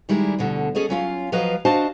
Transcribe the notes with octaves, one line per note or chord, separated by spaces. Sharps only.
D#3 G3 G#3 E4 A#4
D2 B2 D3
C#4 G#4 A4 C#5 D#5
F#3 C#4 F4 F5
F3 F#3 B4 D#5 F5 A#5
D4 F#4 C5 D#5 F5 A5